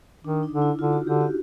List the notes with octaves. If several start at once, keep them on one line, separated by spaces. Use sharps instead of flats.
D#3 D4
D#4
D3
E4
D3 F4
F#4
D3 G4
F#4